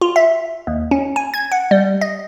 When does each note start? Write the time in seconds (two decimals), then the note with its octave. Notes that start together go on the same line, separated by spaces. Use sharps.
0.01 F4
0.16 E5
0.67 D#2
0.91 C#4
1.16 G#5
1.34 G#6
1.52 F#5
1.71 G3
2.01 D#5